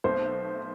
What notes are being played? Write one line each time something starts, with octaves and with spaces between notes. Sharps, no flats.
B1 B2 A3 C4 C5